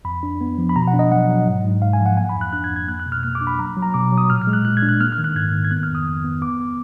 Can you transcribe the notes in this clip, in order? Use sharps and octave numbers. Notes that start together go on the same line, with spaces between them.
F2 B5
D4
B3
F3
B5
B2 A#5
F#5
D4
D#5
F#3 F#5
F#3
G#2
G#2
G#2 F5
G#5
F3
F#5
A#3 G#5
B5
F2
F#6
D4 F#6
G#6
F2
G#6
A#3 F#6
F#6
B2
F6
A#3 F6
D6
D4
B5
F#3 A#5
F#3
A#5
B2 D6
F#3
D#6
A#2 F6
F6
G#3
F#6
A#2 F#6
G#6
D4
F#6
A#3 F6
F6
D#3
F#6
G#2 G#6
D#3
G#6
B3 F#6
F6
F2
D#6
F2
B3
B3 D6
B3